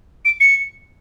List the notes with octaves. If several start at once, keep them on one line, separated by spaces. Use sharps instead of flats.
D7
C#7